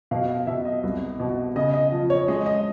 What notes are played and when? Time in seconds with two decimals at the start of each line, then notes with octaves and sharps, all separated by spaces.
0.11 B2 F5
0.29 F5
0.47 B2 E5
0.65 D#5
0.83 C2
1.20 B2
1.56 C#3 D#5
1.74 D#5
1.92 F3
2.10 C#5
2.28 G#3 D#5
2.46 D#5